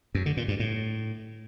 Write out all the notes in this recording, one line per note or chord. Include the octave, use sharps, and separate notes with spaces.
F#2
D3
A#2
G2
A2